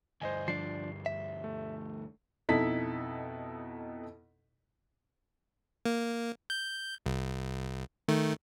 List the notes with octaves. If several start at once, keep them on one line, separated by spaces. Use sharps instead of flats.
D2 G2 C5 D#5 G#5
F3 D4 C7
E5
A3
F2 B2 D#4 E4 A4 B6
A#3
G6
C2
D#3 A3